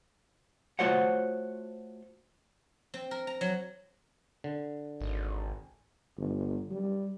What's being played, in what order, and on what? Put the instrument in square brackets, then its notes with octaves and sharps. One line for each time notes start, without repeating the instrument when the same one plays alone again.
[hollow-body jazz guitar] A3 F4 F#4 C5 C#5 F#5
[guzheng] C4
A#4
A#5
F#3
[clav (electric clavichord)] D3
[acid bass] G#1
[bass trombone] G1
G3